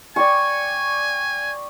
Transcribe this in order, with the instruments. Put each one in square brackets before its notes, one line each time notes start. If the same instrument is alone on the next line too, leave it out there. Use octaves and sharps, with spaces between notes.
[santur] D5 G5 C#6 [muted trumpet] G#5